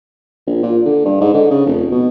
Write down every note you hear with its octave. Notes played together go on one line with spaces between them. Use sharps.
A#1
A#2
D3
G2
G#2
D3
C#3
F1
B2